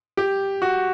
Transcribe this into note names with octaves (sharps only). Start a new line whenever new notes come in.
G4
F#4